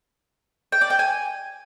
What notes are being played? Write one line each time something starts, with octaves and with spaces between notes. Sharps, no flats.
G5
D5
G5
G#5